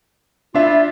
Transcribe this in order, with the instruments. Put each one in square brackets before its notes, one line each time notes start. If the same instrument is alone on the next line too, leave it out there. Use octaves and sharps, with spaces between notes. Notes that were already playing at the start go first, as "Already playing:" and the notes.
[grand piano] D4 E5 [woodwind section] E4 F4